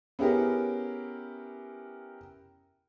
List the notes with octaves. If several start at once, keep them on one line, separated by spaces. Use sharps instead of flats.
B3 C#4 E4 G4 G#4 A#4